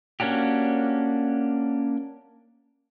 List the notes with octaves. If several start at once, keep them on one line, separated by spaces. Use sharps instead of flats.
A#3 C#4 D4 F#4 G4